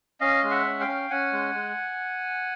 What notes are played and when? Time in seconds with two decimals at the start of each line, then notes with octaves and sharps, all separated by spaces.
0.20 C#4 D#5 F5
0.43 G#3 F5
0.50 E5 F#5
0.66 C#4
0.80 F5 G5
0.88 C#4
1.10 C#4 F#5 G#5
1.32 G#3
1.55 G#3